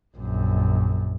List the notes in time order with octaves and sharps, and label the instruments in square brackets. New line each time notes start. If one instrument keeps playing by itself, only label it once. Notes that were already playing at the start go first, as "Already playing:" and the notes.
[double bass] A#1 F#2